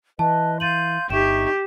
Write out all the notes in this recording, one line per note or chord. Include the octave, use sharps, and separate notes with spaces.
E3 B4 D#5 A5
F5 C6 G6 A6 D#7 F#7
G1 D#4 G4 E5 C#6 E7